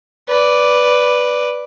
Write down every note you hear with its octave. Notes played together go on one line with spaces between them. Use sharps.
B4 D5